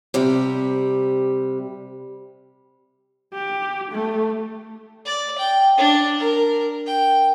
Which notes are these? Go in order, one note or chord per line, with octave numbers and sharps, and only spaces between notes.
C3 G3
G4
A3
D5
G5
D4
A#4
G5